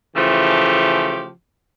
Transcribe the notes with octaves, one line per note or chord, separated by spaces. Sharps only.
C#3 E3 F3 A3 G4